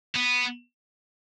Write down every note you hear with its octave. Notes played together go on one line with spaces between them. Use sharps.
B3